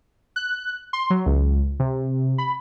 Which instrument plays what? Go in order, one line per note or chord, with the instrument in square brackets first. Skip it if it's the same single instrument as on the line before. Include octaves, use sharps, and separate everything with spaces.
[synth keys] F#6
C6
F#3
C#2
C3
B5